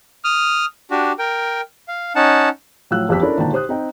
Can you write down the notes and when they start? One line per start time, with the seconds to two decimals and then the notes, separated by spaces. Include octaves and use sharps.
0.24 D#6 F6
0.91 D4 F#4 G4
1.19 A#4 G5
1.88 F5
2.16 C#4 D#4 F#5 A5
2.91 A2 F3 F#3 F5 E6 F#6
3.09 G1 F2 G4 E6 B6
3.22 C#4 D4 E4 A4 A#4
3.38 G#1 A#2 D3 G5 A5 A#5
3.52 G4 C5 D#6 F#6
3.69 C4 D#4 G5